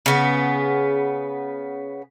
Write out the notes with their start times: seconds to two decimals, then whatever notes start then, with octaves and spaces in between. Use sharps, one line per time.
0.06 C#3 B3